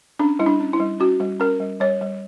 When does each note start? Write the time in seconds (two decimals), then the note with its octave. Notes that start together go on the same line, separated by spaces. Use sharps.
0.19 C#4 D4
0.39 G3 E4
0.46 D4
0.60 C#4
0.73 E4
0.79 G3
1.00 C#4 F#4
1.20 G3
1.40 C#4 A#4
1.60 G3
1.80 G3 C#5
2.01 G3